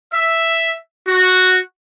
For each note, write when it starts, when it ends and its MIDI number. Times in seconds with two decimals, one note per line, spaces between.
0.14 0.76 76
1.09 1.59 66